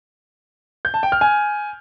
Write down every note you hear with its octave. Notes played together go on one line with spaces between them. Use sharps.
G6
A5
G5
F6
G#5